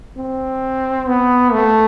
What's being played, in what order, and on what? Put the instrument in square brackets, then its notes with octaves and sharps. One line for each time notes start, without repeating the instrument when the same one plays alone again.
[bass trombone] C4
B3
A3